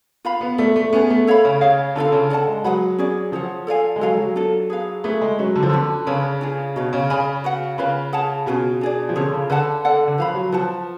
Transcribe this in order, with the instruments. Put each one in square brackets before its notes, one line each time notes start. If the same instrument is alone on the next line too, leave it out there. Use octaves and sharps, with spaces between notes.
[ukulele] F4 B4 F5 B5
[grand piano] B3
[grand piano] A3 [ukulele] F4 A4 D5
[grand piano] A3
[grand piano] B3 [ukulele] C#4 F4 G#4
[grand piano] A3
[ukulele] A4 C#5 F5 B5
[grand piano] C#3
[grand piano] C#3 [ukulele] G#4 C#5 F5
[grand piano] D3 [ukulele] D4 F4 A4 F5
[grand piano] C#3
[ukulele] A4 D5 F#5 A5
[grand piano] G#3
[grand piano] F#3 [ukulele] G#4 B4 F#5 B5
[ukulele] C#4 G#4 D5
[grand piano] F3 [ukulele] G#4 C#5 F#5
[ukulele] A4 D5 F5 G#5
[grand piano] G#3
[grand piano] F#3 [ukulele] A4 C#5 F5 G#5
[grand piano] F#3
[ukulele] D4 F4 A4
G#4 B4 F5
[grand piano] A3 [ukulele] F4 G#4 B4
[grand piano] G#3
[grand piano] F#3 [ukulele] C#4 F#4 B4
[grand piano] D3
F3
[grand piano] D3 [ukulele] C#4 F#4 B4
[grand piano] C#3 [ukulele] D4 G#4 B4
[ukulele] D4 F4 G#4
[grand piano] B2 [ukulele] F#4 C#5 F5
[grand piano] C#3
[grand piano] C#3 [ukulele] G#4 D5 G#5 B5
[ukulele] F#4 B4 F#5
[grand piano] C#3 [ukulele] F4 B4 F5 B5
[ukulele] G#4 C#5 F#5 A5
[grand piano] B2 [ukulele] C#4 F4 G#4
[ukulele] D4 G#4 D5
[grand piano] F3
[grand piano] D3 [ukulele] C#4 G#4 C#5
[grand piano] C#3
[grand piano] D3 [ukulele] B4 D5 F#5 A5
[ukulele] A4 D5 F#5
[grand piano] D3
[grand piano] F3 [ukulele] B4 F5 B5
[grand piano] F#3
[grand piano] F3 [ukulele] B4 F#5 A5